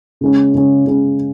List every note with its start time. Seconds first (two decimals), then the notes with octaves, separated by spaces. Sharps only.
0.21 C#3 G#3 C#4
0.54 C#3 G#3 C#4
0.85 C#3 G#3 C#4